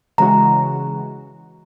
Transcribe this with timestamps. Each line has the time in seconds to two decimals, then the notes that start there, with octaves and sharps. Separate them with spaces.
0.18 C#3 E3 G#3 C#4 F#4 A#5